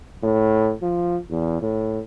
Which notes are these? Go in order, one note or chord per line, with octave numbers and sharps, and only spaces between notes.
A2
F3
E2
A2